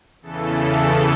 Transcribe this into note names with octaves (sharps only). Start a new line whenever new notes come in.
E2 C#3 E3 A4